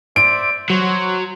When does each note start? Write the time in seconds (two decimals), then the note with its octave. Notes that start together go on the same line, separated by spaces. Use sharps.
0.16 C5 D5 E5 D7
0.70 F#3 C5 C#5